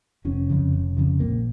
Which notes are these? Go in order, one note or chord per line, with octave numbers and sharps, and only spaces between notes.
F1 C#4
F2 C#3
F1
F2 C#3
A#1 A#3